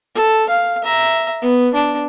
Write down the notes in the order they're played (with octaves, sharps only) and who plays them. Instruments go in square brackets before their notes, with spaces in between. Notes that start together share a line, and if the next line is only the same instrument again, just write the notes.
[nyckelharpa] A4
F5
E5 A#5
B3
D4